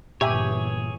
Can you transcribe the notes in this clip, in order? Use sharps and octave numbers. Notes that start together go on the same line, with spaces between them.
G1 A#2 E3 G4 G#4 C#5 E5 G#5